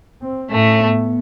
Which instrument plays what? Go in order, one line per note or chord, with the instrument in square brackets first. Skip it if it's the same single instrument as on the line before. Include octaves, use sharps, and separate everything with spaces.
[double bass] C4
[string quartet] A2 A3 [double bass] C#4
[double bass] B3